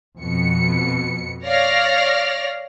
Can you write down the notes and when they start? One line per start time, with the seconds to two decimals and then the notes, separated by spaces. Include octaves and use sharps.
0.20 F2 B2 C#7
1.44 C#5 D5 F5 F6 A#6